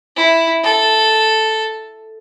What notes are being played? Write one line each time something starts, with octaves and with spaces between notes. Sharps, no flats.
E4
A4